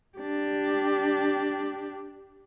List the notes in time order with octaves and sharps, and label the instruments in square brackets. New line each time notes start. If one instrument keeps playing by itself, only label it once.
[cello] D4 G4